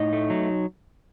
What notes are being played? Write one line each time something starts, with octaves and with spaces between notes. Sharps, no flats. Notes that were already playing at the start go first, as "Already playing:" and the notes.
Already playing: A2 D#4 D#5
A3
F#3